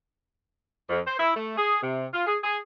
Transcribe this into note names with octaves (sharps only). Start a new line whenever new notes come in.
F2
C5
E4
A3
G#4
C3
F4
G#4
G#4